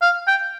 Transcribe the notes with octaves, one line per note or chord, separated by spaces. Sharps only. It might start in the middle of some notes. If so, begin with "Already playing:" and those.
F5
G5